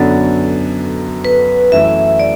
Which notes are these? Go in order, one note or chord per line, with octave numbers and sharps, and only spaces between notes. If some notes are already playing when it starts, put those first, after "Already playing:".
Already playing: F#2 D3 F#3 B3 D4 A4
B4
F#2 E3 A3 E4 E5
D5